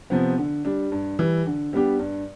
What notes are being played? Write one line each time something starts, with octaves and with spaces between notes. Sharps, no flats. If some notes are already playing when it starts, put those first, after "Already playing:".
C3 F3 B3
D3
G3 D4
G2
E3 G3
D3
G3 B3 D4 G4
G2